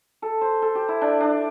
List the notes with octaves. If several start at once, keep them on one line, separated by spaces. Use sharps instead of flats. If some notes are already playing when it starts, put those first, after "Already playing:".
A4
C5
A4
G4
E4
D4
D4